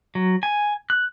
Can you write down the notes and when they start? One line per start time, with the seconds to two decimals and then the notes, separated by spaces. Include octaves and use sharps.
0.15 F#3
0.43 G#5
0.90 F#6